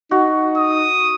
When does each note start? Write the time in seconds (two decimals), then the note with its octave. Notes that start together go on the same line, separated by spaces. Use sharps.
0.11 D#4 F#4
0.57 D#6